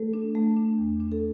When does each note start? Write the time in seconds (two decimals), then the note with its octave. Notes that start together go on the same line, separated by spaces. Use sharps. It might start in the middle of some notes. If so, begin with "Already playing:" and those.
Already playing: A3 A4
0.14 D4
0.35 A3
0.57 D4
0.78 E2
1.00 D4
1.12 A4